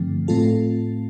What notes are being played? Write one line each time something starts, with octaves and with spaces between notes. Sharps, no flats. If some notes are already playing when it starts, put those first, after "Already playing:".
Already playing: G2 D3 F3 A3 C4
A2 A3 C4 F4 A4